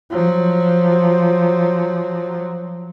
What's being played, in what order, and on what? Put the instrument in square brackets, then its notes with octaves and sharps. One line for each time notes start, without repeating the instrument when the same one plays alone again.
[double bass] F3 F#3